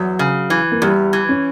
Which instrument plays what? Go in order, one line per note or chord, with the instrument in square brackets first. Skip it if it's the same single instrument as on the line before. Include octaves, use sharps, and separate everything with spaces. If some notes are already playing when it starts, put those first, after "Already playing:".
Already playing: [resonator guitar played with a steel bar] E2 [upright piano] F#3
[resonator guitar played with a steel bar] C#3
E3
[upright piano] A#3
[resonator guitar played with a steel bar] E2 [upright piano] G3
[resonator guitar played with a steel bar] E3
[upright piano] C#4